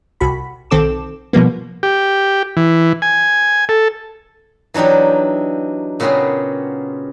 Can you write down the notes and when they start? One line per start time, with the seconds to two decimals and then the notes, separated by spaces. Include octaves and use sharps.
0.20 C2 F#4 B5
0.70 B1 D#3 C4 A4 D6 E7
1.33 B2 F3 G3 A#3 B3
1.83 G4
2.57 E3
3.02 G#5
3.69 A4
4.74 E3 F#3 D4 D#4 G4
6.00 A#2 C#3 B3 C4 F#4 G#4